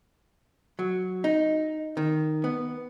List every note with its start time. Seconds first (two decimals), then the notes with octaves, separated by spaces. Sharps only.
0.79 F#3
1.24 D#4
1.97 D#3
2.44 B3